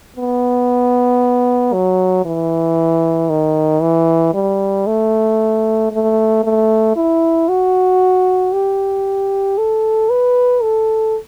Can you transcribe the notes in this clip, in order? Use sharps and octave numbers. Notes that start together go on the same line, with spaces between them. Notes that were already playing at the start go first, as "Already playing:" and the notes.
B3
F#3
E3
D#3
E3
G3
A3
A3
A3
E4
F#4
G4
A4
B4
A4